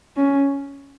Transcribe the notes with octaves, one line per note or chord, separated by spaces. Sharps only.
C#4